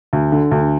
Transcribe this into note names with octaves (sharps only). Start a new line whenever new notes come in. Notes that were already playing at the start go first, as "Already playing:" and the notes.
D2
D3
D2